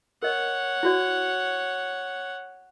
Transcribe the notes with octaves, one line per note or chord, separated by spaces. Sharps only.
A#4 C#5 D#5 F#5
E4 F#4 D5